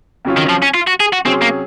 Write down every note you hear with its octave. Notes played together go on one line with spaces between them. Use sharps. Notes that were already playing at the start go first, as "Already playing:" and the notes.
F2 C#3 F#3 C#4 F4
D#3
F3
C#4
F4
F#4
G#4
F#4
C3 F#3 C4 C#4 G#4
A#3